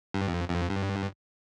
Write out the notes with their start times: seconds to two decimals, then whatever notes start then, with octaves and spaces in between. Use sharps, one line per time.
0.14 G2
0.28 F2
0.48 F2
0.70 G2